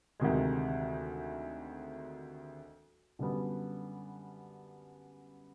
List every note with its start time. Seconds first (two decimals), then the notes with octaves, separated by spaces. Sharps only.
0.20 D2 C3 D#3 G#3
3.19 F#2 D3 G3 B3